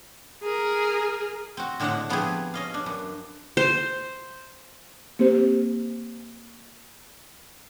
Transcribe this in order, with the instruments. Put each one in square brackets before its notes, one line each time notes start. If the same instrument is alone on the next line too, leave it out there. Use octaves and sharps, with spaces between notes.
[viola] G#4 A#4
[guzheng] C4 F#4
A2 D3 G#3 D4 A4 F#5
F3 B3 C4 G4 G#4
C#4 D#5 F5
D4
F#2
[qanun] C5
[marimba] A#3 C4 G4 C5